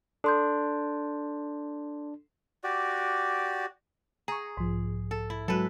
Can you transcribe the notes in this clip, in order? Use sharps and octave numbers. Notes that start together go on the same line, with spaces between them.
D4 A4 C6 G6
F#4 G4 D5
G#4 A#5 C#6
B1 G#2 F3
A4
E4
F#3 G#3 F#4 A4 B4